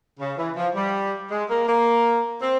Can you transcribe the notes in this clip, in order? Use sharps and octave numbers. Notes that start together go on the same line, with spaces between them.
C#3
E3
F3
G3
G#3
A#3
A#3
C4